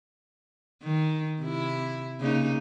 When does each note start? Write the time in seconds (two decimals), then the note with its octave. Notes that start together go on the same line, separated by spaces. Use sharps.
0.83 D#3
1.40 C3 E4
2.20 C#3 A#3 D#4